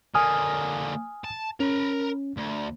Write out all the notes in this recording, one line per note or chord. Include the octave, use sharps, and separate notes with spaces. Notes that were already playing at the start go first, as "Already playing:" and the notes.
D3 A#3 G#5 D#6 F6
A5
C#4 A#4 B5
D2